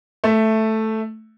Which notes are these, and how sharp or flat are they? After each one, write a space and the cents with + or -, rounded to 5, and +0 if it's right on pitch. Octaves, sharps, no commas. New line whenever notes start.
A3 +0 E5 +5